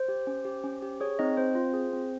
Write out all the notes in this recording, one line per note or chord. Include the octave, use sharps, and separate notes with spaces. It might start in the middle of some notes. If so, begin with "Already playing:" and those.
Already playing: C5
G4
C#4
G4
C#4
G4
G#4 C#5
C4 D#4 D#5
C4 C5
F4
G#4
C4